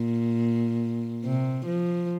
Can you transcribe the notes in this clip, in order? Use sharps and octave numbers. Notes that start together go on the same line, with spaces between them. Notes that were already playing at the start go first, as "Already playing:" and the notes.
Already playing: A#2
C3
F3